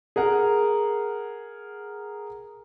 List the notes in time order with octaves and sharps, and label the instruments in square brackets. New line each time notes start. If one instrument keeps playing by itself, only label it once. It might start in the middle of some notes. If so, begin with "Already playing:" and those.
[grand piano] G#4 A#4 F#5